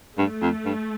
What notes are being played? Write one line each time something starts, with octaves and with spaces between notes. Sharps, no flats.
G2 A3
F2
G2